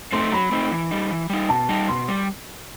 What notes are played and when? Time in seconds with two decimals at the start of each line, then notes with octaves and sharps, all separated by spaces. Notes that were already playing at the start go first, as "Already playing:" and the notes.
0.12 A3 C4 D#4 C6
0.32 F#3 B5
0.52 A3 C4 D#4
0.71 E3
0.91 G3 D#4
1.11 E3
1.30 G3 D#4
1.49 B2 A5
1.69 G3 D#4
1.88 B2 C6
2.08 G3